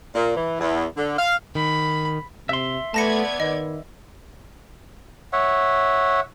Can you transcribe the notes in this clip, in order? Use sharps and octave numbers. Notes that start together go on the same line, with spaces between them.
A#2
E3
E2
D3
F5
D#3 B5
C3 E5 C6
A3 B3 D5 A5 G#6 A#6 C#7
D#3 D#5
C#5 E5 F#5